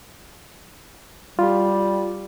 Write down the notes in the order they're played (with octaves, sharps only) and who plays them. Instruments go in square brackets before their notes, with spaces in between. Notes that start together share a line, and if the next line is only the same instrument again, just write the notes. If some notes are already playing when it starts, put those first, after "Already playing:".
[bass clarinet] G3 [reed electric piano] F4 G4